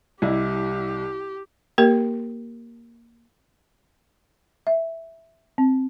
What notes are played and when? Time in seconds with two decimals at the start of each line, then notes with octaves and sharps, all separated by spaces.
0.22 C2 E4 G4 D#5
1.78 A#3 G4 A#4
4.67 E5
5.58 C4